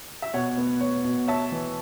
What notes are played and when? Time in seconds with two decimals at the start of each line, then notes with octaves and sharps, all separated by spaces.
0.22 E5
0.34 B2 C#5 F#5
0.57 B3
0.81 C#5
1.05 B2
1.28 C#5 E5 A5
1.52 E3